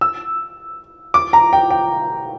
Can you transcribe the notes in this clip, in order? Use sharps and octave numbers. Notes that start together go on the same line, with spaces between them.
E6
D6
A#5
G5
G5